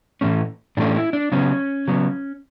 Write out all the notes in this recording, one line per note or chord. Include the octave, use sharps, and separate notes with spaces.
A2 E3 A3 C#4
A2 E3 A3 C#4 D4
E4
D4
C#3 F#3 B3 C#4
C#3 F#3 B3